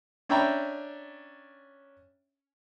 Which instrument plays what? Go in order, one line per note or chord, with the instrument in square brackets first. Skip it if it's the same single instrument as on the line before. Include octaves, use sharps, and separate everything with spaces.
[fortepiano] C#4 D4 E5 G5 A#5 B5